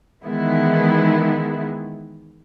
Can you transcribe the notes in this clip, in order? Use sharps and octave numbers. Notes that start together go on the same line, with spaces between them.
D#3 E3 G#3 B3 E4